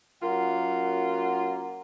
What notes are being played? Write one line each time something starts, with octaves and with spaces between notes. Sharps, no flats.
F#2 A#3 F4 F#5